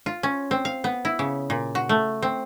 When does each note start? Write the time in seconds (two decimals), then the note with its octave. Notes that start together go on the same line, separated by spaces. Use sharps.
0.06 F4
0.23 C#4
0.51 C4
0.65 F5
0.84 B3
1.05 E4
1.19 C#3
1.50 A#2
1.75 F#4
1.89 A3
2.22 C4